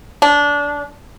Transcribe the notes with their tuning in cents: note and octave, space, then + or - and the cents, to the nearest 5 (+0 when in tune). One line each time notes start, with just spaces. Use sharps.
D4 -20